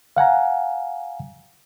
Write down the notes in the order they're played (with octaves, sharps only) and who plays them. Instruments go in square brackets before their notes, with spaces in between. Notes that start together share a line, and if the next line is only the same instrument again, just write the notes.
[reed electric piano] F5 F#5 G#5 A#5